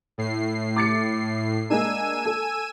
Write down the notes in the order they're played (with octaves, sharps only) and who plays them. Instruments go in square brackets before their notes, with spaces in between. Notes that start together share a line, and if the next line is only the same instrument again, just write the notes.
[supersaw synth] A2 C7
[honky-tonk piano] D6 A6 C#7
[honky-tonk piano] G#3 A#3 D4 [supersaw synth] G#5 E6 D#7
[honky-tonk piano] A4